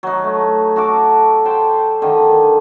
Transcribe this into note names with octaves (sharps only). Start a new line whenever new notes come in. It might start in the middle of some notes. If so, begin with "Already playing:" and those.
F#3 D#4
A3
F#4 A4 D6
C5 G5 A5
D3 D#3